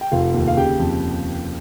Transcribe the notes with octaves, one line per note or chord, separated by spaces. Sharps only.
G5
F1 F4 F5
D#2
F5
C#3 G4 G5
F2